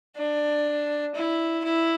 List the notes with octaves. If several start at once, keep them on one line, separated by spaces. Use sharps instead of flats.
D4
E4
E4